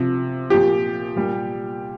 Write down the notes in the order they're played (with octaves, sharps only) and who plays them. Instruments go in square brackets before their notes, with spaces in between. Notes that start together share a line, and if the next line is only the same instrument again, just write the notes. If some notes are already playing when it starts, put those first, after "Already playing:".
Already playing: [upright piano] C3 F3
A#2 F3 G4
A#2 G3